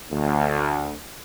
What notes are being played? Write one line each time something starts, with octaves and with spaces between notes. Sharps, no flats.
D2